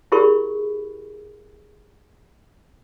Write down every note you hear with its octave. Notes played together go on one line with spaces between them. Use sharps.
E4 G4 G#4 A#4 B5 C#6